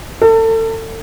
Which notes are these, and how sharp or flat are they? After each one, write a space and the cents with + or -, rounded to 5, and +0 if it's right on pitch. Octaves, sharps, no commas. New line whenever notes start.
A4 +35